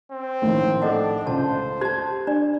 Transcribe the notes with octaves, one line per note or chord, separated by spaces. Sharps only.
C4
A#1 A2 D#3
D4 A4 D#5 F#5
C#2 C5 A5
G4 A5 G#6
D4 D5